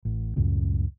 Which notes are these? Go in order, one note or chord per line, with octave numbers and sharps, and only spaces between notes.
A1
C#2 F#2 A2 C#3